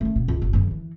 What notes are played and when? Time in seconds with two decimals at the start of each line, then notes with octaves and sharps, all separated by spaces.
0.01 A3 C#4
0.16 B2
0.28 C#2
0.42 G1
0.53 F#2 C#3
0.71 E3